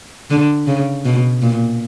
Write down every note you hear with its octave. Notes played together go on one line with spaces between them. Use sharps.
D3
C#3
B2
A#2